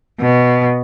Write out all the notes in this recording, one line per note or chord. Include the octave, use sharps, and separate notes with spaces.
B2